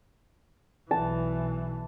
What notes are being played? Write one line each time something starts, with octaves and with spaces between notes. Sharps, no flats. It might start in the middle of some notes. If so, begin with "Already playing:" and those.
B1 E3 A5